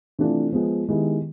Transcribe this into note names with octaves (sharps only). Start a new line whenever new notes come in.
C3 E3 A3 D4 F4
F3 G#3 B3
D#3 G#3 B3 E4 G4